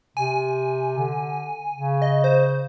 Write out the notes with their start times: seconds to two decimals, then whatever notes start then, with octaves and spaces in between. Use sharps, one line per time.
0.17 C3 G#5
0.98 D3
1.73 C#3
2.02 D#5
2.24 C5